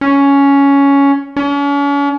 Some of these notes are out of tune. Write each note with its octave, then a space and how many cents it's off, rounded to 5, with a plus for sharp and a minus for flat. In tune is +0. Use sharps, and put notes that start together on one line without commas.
C#4 +10
C#4 +40